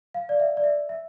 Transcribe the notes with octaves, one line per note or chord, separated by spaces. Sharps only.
F5
D5
E5
D5
E5
E5